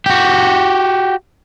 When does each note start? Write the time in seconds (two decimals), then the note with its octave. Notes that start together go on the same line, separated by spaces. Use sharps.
0.06 F#4 G4